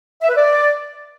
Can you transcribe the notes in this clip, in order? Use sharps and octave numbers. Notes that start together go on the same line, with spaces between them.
E5
B4
D5